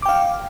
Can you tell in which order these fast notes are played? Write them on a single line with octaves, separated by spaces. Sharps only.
D6 G5 F5